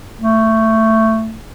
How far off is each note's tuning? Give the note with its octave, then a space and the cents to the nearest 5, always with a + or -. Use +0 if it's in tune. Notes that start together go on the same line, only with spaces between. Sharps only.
A3 +15